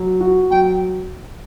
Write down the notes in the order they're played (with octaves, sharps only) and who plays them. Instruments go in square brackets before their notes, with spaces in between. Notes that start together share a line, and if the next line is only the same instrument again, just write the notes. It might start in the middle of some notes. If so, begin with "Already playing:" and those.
Already playing: [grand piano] F#3
F#4
[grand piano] F#3 [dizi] G5